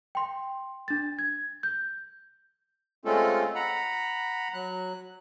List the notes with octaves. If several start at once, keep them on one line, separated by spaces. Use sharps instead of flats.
G5 C6
D4 A6
G#6
G6
G#3 A3 C4 C#4 F4 A4
F#5 A#5 B5
F#3 F#6